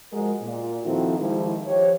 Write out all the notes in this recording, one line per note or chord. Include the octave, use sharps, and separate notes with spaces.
F3 G#3 F#4 A#4
A#2
D#3 F3 C4 E4 F#4 A4
D#3 F3 G3 G#3 E4
F3 G4 C#5